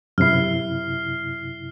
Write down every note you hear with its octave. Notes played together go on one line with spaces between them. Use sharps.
F#2 C3 E4 F6 C7